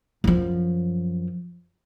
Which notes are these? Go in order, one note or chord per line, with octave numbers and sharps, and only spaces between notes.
F#2 F3